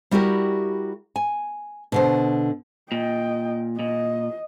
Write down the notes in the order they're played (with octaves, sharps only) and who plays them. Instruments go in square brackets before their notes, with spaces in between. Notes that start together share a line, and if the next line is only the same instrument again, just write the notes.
[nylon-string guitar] G3 E4 F#4 G4 A#4
G#5
B2 D3 C5
[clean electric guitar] A#2 [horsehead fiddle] D#5 G5
[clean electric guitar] A#2 [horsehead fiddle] D#5